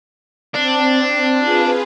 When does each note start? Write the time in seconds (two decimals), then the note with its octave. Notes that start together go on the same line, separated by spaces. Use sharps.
0.54 C4 D4
1.39 F4 G#4 B4